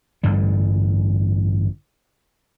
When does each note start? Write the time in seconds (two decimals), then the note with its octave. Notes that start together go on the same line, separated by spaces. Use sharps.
0.23 A1 G2 D3 G3